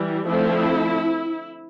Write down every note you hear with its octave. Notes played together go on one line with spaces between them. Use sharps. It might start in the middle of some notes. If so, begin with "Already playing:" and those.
Already playing: E3 G3
D3 F3 A3 C4 E4